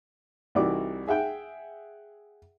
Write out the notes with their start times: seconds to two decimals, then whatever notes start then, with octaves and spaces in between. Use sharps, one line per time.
0.55 C2 E3 D#4 F#4 D5 D6
1.08 G#4 E5 F#5 G5